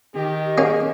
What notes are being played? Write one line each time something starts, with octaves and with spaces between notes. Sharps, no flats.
D#3 G4
A#3 C#4 G#4